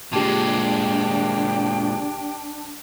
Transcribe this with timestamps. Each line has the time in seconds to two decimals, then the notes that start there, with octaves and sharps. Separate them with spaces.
0.13 A#2 G#3 D4 G4 G5 A5